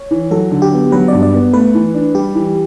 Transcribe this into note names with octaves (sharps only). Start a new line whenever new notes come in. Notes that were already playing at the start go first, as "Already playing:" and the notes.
Already playing: C#5
E3
F#3 A4
D3
G4
B3
F#3 B4
G2 D5
D5
B3
A3 B4
E3
D4
G3 G4
E3